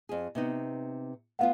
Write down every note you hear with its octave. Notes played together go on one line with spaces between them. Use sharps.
F2 G#4
C3 B3 D#4
A3 B3 F4 F5 F#5